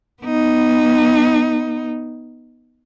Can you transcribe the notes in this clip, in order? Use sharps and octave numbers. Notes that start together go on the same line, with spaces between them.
B3 D#4